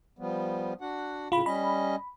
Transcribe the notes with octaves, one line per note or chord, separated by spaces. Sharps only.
F3 G3 B3
D4 F#4 F#5
A2 C#3 F4 B5
G3 C#4 D#5 B5